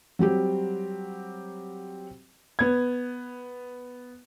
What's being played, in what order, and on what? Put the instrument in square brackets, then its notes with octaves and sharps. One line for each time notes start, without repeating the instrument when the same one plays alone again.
[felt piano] F#3 G3 C4 G4
[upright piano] B3 G#6